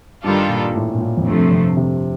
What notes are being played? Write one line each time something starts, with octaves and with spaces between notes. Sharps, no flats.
G2 D#3 G3 D4 F4 A4
A#2
A2
A#2
A2
F2
G2 C3 F3 A3
F2
C3